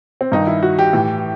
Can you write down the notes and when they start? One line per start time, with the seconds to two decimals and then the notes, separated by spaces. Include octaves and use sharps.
0.21 C4
0.32 G2 D#3 D#4
0.47 E4
0.63 F#4
0.79 G4
0.93 A2 E3